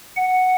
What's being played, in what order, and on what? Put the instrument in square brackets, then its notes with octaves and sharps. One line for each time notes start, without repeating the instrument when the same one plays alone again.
[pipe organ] F#5